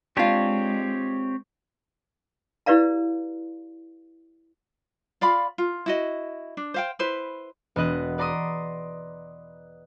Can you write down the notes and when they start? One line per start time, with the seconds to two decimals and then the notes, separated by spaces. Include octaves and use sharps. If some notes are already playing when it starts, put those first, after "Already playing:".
0.17 G#3 C4 D4 F4 G4 C#5
2.66 E4 G4 B4 D5 F5 A#5
5.21 F4 D5 F5 B5
5.58 F4
5.86 E4 F#4 D#5
6.57 D4
6.74 C5 F5 G5
6.99 E4 B4 C5
7.76 E1 B3 B4 D#5 F#6
8.18 B4 D5 A#5 C6 D#6